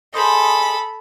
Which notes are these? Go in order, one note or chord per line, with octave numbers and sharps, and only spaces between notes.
G#4 A4 C5 D#5 B5